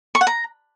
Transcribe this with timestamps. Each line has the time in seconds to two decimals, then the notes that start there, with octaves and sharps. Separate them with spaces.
0.15 C#6
0.21 F#5
0.27 A#5